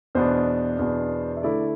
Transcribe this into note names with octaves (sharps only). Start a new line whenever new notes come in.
E2 B2 B3 D4 C5
E2 B2 B3 D4
E5
D3 A3 E4 D5